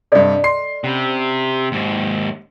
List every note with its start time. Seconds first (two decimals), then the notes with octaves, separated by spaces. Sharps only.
0.12 G2 C3 A4 D5 D#5
0.44 C6 C7
0.84 C3 C#4 F#5 B5
1.72 D#2 G#2